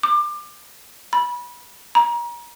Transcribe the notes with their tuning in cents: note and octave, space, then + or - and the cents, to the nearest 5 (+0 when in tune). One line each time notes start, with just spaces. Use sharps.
D6 +25
B5 -25
A#5 +35